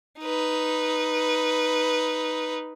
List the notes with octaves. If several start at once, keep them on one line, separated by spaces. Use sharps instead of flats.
D#4 B4